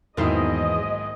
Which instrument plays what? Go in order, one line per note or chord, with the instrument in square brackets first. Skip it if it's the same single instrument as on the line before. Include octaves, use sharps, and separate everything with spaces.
[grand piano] B1 G#2 E4 [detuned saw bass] E2 [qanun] D#3 A#3 C5 [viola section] D#5